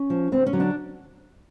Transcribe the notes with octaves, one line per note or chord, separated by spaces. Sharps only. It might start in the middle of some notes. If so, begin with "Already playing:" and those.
Already playing: C#4
F3
D2 C4
C#4
D3 F#3
D4